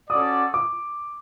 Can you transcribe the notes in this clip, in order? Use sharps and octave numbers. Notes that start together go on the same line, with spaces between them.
C#4 F#4 A4 D5 D#6
D6